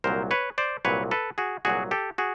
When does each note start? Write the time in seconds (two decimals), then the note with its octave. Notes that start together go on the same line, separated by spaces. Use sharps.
0.04 C2 A#2 F#3 A#4 C5
0.31 B4 C#5
0.58 C5 D5
0.85 C2 A#2 F#3 B4 C#5
1.11 A4 B4
1.38 F#4 G#4
1.65 C2 A#2 F#3 F#4 G#4
1.91 G4 A4
2.18 F#4 G#4